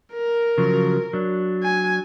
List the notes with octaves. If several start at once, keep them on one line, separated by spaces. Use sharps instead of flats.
A#4
C#3 F3 F#3
F#3 D4
G#5